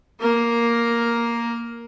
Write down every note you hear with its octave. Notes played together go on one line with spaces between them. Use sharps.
A#3 A#4